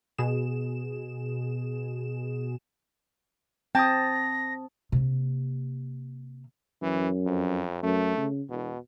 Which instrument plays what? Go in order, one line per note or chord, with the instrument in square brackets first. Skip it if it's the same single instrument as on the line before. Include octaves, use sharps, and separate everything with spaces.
[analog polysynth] B2 G#4 E7
[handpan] C4 [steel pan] G5 [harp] A5 D#6 [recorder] A#6
[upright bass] C3 A#3
[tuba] F#2 [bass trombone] E3
[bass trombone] F2
[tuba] F#2 [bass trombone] A3
[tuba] C#3
[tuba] E1 [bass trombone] B2